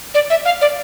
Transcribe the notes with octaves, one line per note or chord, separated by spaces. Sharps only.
D5
E5
F5
D5